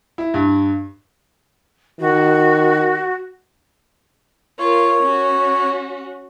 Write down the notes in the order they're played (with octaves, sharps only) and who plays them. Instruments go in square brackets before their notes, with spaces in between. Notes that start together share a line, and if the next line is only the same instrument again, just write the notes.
[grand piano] E4
G2
[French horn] D#3 [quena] F#4
[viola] F4 A#4 [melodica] C#5
[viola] C#4 F#4